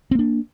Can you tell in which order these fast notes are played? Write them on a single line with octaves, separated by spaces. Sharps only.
C4 A#3 D4